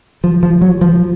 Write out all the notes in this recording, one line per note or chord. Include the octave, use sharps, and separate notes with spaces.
F3
F3
F#3
F3